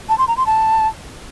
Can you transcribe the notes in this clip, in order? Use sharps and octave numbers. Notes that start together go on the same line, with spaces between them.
A5
C6
A#5
C6
A5